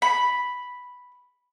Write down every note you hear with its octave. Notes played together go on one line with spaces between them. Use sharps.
B5